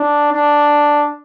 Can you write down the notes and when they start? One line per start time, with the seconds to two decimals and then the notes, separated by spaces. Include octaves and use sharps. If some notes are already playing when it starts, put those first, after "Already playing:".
Already playing: D4
0.32 D4